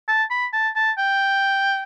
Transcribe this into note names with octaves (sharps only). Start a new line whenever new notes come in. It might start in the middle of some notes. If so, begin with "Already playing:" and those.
A5
B5
A5
A5
G5